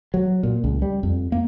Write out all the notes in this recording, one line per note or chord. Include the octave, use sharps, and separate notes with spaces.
F#3
A#2
C#2
G3
F2
A#3